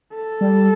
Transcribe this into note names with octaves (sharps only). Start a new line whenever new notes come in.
A4
G3